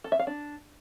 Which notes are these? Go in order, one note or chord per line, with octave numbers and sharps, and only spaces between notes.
A4
E5
F5
D4